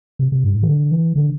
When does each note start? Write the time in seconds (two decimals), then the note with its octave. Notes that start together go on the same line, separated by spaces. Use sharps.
0.19 C3
0.32 C3
0.44 G2
0.55 A2
0.63 E3
0.68 D3
0.91 E3
1.15 D3